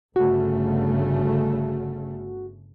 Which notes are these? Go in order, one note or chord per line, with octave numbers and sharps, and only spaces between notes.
G1 C#3 A3 F#4